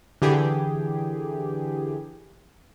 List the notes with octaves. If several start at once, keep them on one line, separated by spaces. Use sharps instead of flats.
D3 E3 G4 G#4